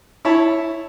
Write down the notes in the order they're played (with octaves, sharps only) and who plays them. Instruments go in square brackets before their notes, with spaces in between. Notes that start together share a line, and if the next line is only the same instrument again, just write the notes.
[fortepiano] E4 C#5 E5 A5